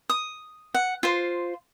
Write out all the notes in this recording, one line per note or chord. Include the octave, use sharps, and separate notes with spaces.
D#6
F#5
F4 C5